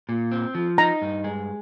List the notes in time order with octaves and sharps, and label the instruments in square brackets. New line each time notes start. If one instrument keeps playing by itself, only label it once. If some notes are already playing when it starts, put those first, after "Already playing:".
[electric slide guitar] A#2
C4
F3
[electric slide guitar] D#4 [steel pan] A#5
[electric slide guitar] G2
G#3